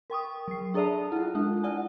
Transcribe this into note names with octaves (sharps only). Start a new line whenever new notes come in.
A#4 G5 C#6 D#6
F#3 C7
D4 G#4 A4 D5 E5 A5
E4 F4
G#3 D4 F4
E4 D5 F#5 G#5